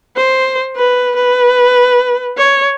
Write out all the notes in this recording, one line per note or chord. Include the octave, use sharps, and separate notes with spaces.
C5
B4
B4
C#5